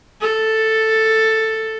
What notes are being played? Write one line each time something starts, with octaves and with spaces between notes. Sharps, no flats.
A4